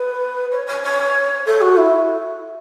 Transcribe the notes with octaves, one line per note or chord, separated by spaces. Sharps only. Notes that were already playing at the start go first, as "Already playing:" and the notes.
Already playing: B4
C#5
C#5
C#5
A4
F#4
E4